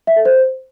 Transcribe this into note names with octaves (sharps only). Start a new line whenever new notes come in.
E5
A4
C5